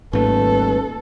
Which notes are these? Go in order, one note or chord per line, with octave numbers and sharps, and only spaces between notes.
D#1 G#1 G#2 A3 A4 B4